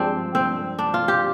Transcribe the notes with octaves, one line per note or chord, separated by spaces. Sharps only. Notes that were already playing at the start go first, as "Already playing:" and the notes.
Already playing: G2 F3 G#3 C4 D4
C4
D4
F4
G4